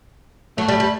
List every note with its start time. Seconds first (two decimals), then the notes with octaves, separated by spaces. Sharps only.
0.57 F#3 A3
0.68 G3
0.80 G3